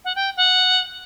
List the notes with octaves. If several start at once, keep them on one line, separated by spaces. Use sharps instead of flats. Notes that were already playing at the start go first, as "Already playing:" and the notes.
F#5
G5
F#5